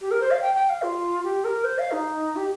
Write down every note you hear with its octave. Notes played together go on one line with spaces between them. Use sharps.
G4
A#4
C5
F5
G5
G5
F5
F4
G4
A#4
C5
F5
D#4
G4